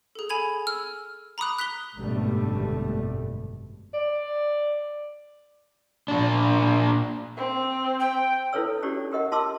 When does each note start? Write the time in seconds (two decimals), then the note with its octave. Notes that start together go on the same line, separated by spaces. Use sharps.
0.15 G#4 A4
0.29 G#5 B5 G#6 F7
0.67 E6 F6
1.38 A#5 B5 D6 D#6 F#6
1.59 F#6 B6 F7 G7
1.95 G#1 F#2 B2 D3 G3 A3
3.94 D5
6.08 A#2 D4
7.37 C4
8.00 G5
8.53 E4 F4 A4 B4 C#5 E6
8.82 C#4 D#4 F#4 G4 C#5 D5
9.12 G4 A#4 D#5 F#5
9.31 F4 A5 C6 D6 E6